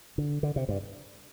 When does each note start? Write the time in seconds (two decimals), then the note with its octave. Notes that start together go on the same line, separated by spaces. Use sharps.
0.18 D3
0.43 D3
0.56 C3
0.69 G2